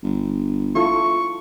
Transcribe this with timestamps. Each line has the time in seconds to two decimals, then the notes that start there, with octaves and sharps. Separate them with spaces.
0.03 G1
0.75 E4 F4 A4 C#6